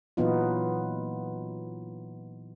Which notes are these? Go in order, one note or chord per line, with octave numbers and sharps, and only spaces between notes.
A#2 E3 F#3 B3 D#4 F4